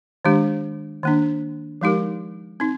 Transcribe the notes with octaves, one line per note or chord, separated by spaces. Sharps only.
D#3 G#3 D4 G4
D#3 A#3 D4
F3 G#3 D#4 G4 A#4
C4 D#4